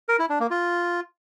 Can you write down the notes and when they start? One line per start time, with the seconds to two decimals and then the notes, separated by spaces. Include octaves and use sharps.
0.09 A#4
0.19 E4
0.30 D4
0.40 A#3
0.50 F4